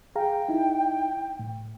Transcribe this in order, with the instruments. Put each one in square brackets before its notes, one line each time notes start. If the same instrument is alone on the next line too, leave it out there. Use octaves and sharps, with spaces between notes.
[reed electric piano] G#4 F5 A#5 [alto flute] G5
[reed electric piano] D#4 E4
A2